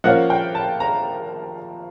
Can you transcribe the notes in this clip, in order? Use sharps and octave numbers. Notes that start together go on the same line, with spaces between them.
F3 A#3 C#4 F4 F#5
G5
A5
A#5